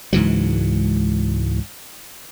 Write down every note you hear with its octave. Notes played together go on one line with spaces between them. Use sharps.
C#2 G#2 E3 F#3